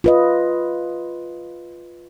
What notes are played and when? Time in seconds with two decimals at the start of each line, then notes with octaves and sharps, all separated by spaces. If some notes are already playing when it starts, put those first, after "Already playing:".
0.04 F4 B4 D#5